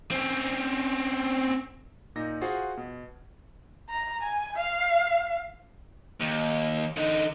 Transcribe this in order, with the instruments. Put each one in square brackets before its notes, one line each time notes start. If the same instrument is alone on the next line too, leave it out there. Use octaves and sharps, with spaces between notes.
[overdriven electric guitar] C4 C#4
[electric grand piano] A#2 D#4 A#6
F4 F#4 G#4 C5 F#5
B2
[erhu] A#5
G#5
F5
[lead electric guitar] D#2
D3 D#4